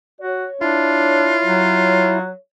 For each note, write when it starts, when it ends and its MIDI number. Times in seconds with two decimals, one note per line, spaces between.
0.21 0.46 66
0.21 2.37 73
0.61 1.33 62
0.61 2.19 64
0.61 2.23 65
1.44 2.30 54